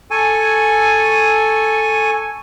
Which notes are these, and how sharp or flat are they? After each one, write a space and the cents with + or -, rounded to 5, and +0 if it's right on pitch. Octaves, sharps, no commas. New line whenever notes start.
A4 +0 G#5 +0 C#6 +0